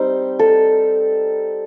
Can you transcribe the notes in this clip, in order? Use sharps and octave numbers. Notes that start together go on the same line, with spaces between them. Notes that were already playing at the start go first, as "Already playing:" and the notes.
Already playing: G3 C4 D#4
A4